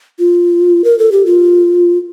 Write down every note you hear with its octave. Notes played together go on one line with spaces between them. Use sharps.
F4
A#4
A4
G4
F4